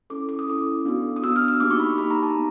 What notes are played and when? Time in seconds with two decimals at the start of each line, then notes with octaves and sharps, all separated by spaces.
0.10 C#4 E4 A4 D6
0.29 D6
0.39 D#6
0.48 C#4 E4 A4 D6
0.85 B3 D4 F#4
1.16 D#6
1.23 B3 D4 F#4 E6
1.36 F6
1.48 E6
1.60 A#3 D#4 G4 D6
1.70 C#6
1.80 B5
1.98 A#3 D#4 G4 B5
2.11 A#5
2.23 A5
2.35 B3